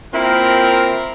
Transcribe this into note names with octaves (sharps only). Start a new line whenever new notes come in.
A#3 C4 E4 F4 A#4